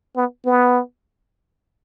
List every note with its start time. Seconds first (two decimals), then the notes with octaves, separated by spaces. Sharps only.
0.16 B3
0.45 B3